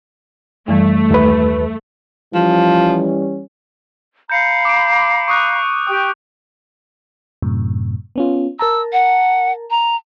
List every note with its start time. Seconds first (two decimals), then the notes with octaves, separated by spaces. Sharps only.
0.68 F#2 E3 G3 A3
1.11 D#2 B4
2.34 E3 F3 G3 C#4
4.30 F5 A#5 B5 G6 C#7
4.65 D6 D7
5.28 C#6 D#6 F#6
5.87 G4 G5 D#6
7.42 F#2 A2 C3
8.16 B3 C#4 F4
8.59 A#4 A5 A#5 E6
8.93 F#5
9.70 A#5